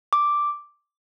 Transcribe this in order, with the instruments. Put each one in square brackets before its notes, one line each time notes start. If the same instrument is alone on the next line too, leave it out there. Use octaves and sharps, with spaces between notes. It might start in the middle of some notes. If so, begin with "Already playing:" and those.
[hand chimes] D6